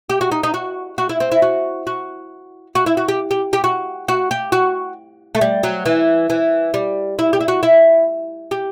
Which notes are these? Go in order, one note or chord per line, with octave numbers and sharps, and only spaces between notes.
G4
F#4
D#4
D#4
F#4
F#4
E4
C4
E4
F#4
F#4
F#4
E4
F#4
G4
G4
G4
F#4
F#4
G4
F#4
A3
G3
F#3
E3
E3
G3
E4
G4
E4
F#4
E4
G4